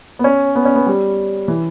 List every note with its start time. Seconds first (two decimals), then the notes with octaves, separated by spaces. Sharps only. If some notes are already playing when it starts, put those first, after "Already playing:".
0.19 B3
0.24 C#4
0.55 B3
0.65 C#4
0.75 B3
0.86 G3
1.48 E3